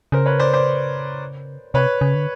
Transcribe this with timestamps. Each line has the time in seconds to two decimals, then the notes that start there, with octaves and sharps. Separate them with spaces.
0.12 C#3 A#4 C5
0.26 B4 C#5
0.40 C5 D5
0.54 C5 D5
1.74 C3 B4 C#5
2.01 C#3
2.15 D3